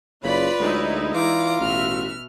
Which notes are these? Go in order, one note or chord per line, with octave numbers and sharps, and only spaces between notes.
F#1 C#3 F4 B4 D5 B5
D2 F#3 G#3 D#4 E4
E3 F4 D5 A#5 D6
A1 B2 F#4 E5 F6